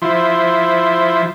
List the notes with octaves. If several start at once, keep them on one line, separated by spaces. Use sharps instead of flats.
F3 E4 C5